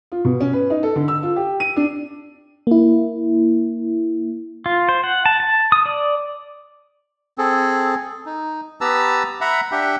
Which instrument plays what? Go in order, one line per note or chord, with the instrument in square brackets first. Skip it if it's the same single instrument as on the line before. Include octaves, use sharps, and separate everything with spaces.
[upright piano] F4
B2
C#4
B4
D#4
A4
D3
E6
F4
G4
D#7
D4
[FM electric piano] A#3 E4
[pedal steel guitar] F4
C5
F#5
A5
A5
D#6
D5
[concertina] C4 G#4 A4
D#4
B3 G4 B4 A5 A#5 E6
E5 F#5 A#5 B5
D4 G4 E5 F#5 G5